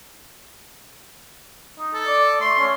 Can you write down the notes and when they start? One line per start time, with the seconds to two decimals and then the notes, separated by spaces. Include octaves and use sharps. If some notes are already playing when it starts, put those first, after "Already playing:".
1.79 D#4
1.94 A4
2.07 D5
2.41 A3 C6
2.58 C#4